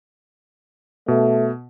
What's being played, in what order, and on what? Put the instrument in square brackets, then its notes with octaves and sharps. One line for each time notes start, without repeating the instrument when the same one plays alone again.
[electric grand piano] B2 [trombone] A3